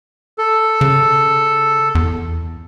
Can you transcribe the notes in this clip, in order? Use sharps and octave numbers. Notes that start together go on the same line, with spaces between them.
A4
C#3
E2